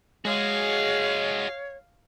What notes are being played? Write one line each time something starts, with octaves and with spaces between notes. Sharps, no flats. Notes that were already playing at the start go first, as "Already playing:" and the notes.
G#3 F#4 G#4 C#5 F5